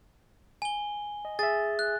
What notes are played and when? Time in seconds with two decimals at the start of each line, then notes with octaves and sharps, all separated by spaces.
0.62 G#5 G7
1.25 D#5
1.39 G#4 E5 A6
1.79 F#6